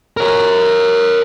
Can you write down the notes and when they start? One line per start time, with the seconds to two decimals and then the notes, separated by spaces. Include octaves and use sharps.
0.17 A#4 C#5